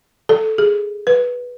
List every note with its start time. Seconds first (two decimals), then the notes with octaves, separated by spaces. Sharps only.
0.29 A4
0.58 G#4
1.07 B4